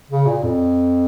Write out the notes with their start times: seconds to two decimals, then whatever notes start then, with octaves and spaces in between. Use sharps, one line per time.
0.10 C#3
0.27 A#2
0.43 F2